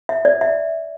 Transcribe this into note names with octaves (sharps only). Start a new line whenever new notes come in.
E5
D5
E5